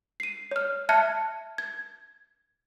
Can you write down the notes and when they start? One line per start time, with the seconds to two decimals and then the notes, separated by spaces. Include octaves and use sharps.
0.20 C7 D#7
0.51 C#5 F6
0.89 E5 A5 F6 F#6 G#6 C#7
1.58 G#6